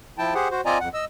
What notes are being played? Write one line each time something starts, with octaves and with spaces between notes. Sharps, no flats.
F3 E4 G5 A5
G4 G#4 C5 F#5
F#4 C5
C4 F4 D5 D#5 G#5 A#5
F2 F#5
D#5 E6